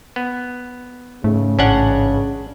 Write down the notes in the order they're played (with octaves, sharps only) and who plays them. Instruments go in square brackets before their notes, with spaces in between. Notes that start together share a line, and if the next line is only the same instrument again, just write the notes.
[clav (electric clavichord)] B3
[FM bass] G#2 [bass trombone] C#3 [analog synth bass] A3
[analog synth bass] A1 [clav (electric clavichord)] C#4 D4 F#5